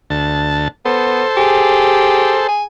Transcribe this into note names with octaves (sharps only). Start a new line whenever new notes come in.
D2 A5
B3 A4 C5
G4 G#4
G#5